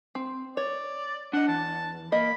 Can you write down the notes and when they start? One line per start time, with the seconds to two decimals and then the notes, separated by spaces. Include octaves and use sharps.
0.15 C4
0.57 C#5 D5
1.33 D4 D#5 F#5
1.48 E2 A5
2.12 A#3 D#5 B5